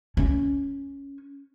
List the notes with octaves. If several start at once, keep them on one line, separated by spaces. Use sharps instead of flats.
C#4